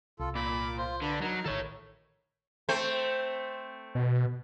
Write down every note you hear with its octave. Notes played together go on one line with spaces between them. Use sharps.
C2 F4 A4
A#2 B5 D6
F4 C5
D3 D4 B4 B5
F#3 D#4 A#4
A1 D#3 A4 C#5
A3 C4 C5
B2